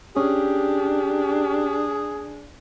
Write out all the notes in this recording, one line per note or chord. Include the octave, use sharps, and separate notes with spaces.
C#4 D4 G4 G#4